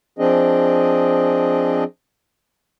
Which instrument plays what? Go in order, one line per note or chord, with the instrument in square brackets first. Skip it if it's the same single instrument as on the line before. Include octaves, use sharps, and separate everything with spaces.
[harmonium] F3 C4 D4 G#4 D#5